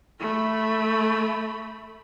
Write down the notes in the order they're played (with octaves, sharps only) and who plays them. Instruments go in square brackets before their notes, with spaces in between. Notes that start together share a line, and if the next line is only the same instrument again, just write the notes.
[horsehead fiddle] A3 B5